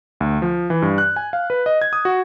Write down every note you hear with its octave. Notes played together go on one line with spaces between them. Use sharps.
D2
F3
E3
G2
F#6
G#5
F5
B4
D#5
G#6
D#6
F#4